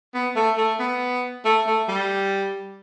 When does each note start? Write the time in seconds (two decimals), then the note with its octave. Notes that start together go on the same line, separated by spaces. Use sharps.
0.14 B3
0.35 A3
0.57 A3
0.79 B3
1.45 A3
1.67 A3
1.88 G3